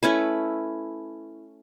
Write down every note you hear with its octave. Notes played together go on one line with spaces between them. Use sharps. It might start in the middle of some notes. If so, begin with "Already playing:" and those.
A3 C#4 E4 B4